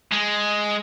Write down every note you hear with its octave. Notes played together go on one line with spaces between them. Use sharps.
G#3